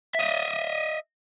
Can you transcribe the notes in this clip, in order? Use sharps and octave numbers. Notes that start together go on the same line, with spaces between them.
D#5 E5